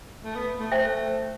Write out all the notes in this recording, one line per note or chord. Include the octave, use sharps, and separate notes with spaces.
A3
B3
A3
A3 C5 E5 G5